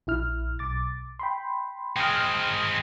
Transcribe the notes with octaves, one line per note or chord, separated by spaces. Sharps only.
A#1 E4 F6
B1 D6 A6
G5 B5 C6
G#3 C4 G5 D#6 F6